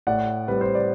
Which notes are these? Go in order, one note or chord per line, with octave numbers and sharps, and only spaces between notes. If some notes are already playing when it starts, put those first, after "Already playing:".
A2 D5 F#5
G3 C4 B4
C5
D5